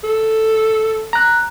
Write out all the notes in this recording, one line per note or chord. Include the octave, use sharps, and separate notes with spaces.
A4
A#5 F#6